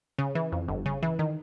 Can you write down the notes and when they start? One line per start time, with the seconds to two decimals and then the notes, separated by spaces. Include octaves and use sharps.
0.18 C#3
0.35 E3
0.52 F2
0.68 G1
0.86 C#3
1.03 E3
1.19 D#3